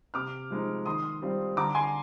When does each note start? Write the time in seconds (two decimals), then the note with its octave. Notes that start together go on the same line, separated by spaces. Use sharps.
0.14 C3 D6 F6
0.50 F3 G#3 D#4
0.86 D#3 C6 D#6
1.22 G3 C4 F4
1.57 D3 A#5 D6
1.75 G#5 C6